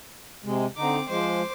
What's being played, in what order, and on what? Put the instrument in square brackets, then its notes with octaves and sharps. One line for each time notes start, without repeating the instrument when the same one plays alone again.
[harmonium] C3 G#3
[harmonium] D3 D#4 [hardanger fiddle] C4 D6
[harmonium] F3 G#3 [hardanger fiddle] C5 D6